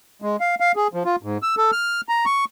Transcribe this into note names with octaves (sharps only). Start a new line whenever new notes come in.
G#3
F5
F5
G#4
F3
F4
G#2
E6
A4
F6
A#5
C#6